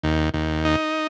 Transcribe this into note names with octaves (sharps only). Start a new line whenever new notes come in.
D#2
D#2
D#4